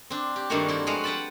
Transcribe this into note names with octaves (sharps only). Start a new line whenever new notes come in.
C4 D4
G4
G2 D#3 A3 A#3 D4 F#4
C4 E4
F3 G#3 F#4 B4 F5
B4 F#5 G5 A5 B5